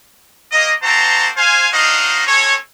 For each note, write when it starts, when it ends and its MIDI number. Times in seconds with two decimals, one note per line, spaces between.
0.52 0.72 58
0.52 0.72 75
0.82 1.29 58
0.82 1.29 60
0.82 1.29 66
0.82 1.29 72
0.82 1.29 81
0.82 1.29 82
1.36 1.67 72
1.36 1.67 77
1.36 1.67 80
1.72 2.25 62
1.72 2.25 63
1.72 2.25 66
1.72 2.25 72
1.72 2.25 75
1.72 2.25 77
2.27 2.55 60
2.27 2.55 61
2.27 2.55 69
2.27 2.55 73